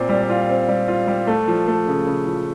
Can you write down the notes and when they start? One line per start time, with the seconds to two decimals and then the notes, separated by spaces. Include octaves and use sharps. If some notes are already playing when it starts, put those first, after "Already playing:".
Already playing: A#2 C4
0.09 G3
0.30 F4
0.49 C4
0.68 G3
0.88 F4
1.08 G3
1.27 A3
1.48 F3
1.68 A3
1.88 C#3
2.06 C#3
2.26 F3